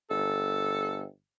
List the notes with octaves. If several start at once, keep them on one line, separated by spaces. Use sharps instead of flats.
G1 A4